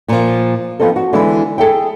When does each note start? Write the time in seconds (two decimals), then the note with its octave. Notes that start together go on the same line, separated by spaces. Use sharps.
0.08 A#2 F3
0.79 F3 B3 C4 D#4 A4
0.96 F#4
1.13 D3 E3 G#3 B3 E4
1.58 G#4 A4 E5 G5